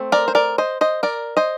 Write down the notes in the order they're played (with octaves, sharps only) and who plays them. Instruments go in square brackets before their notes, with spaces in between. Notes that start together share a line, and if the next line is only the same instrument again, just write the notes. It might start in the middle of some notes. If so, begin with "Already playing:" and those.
Already playing: [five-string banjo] A3 C4
A#4 D5
C5
A#4 D5
C5 D#5
C5 D#5
A#4 D5
C5 D#5